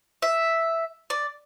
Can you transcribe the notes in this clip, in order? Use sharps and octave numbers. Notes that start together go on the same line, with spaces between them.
E5
D5